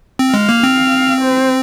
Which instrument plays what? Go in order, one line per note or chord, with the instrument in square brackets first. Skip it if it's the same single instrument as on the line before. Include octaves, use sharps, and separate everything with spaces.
[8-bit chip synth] C4
[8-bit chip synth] G#3 [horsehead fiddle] F5
[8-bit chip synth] A#3
C4
[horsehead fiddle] C5